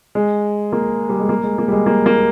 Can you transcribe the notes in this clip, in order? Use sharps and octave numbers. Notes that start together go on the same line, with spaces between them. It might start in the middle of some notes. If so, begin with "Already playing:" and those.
G#3
A#3
G3
G#3
A#3
G#3
A#3
G3
G#3
A#3
A#3